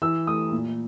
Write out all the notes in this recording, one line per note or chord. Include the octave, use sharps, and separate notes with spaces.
E3 E6
A3 D#6
A#2